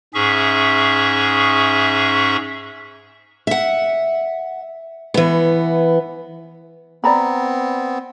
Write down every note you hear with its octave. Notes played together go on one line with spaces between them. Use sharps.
G#2 C#4 G#4 E5 C#6
E5 F#5
E3 B3
B3 C4 D5 A#5 B5